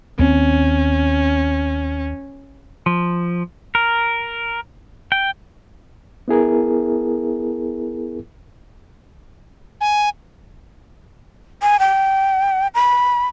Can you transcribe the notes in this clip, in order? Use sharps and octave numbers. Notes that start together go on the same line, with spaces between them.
D#2 C4 C#4
F3
A#4
G5
B3 E4 G#4 A#4
G#5
G#5
G5
B5